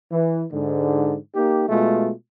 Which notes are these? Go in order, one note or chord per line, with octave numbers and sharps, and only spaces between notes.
E3
G#2 D3
A#3 D#4 G4
B2 G#3 A3 F4